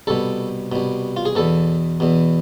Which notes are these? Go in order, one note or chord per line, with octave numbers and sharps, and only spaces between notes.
C2 B2 A4
C2 B2
F4
G#4
E2 B2 A4
E2 B2